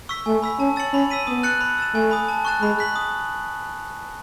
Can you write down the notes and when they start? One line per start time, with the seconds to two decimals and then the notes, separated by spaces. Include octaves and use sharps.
0.09 C#6 E6 B6
0.26 A3 G#5
0.42 B5 E6 B6
0.59 C#4 A5
0.76 E6 A6 C#7 F#7
0.93 C#4 B5
1.10 E6 B6 D#7
1.27 B3 D#6
1.43 F#6 A6 C#7 F#7
1.60 B5
1.78 E6 A6 E7
1.94 A3 G#5
2.11 B5 D#6
2.29 A5
2.45 C#6 F#6 A6 E7
2.61 G#3 B5
2.79 F#6 B6 F#7
2.96 D#6